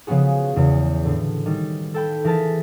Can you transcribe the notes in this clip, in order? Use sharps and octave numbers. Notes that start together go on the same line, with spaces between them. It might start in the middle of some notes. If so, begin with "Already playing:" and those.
C#3 F3 B3 F#4 G#4
E2 C#3
A2 D3
D#3 G3
A4 G5 B5
E3 G#4 A#4 A5 B6